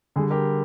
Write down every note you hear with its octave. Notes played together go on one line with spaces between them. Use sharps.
D3 G3 G#4
G4 A#4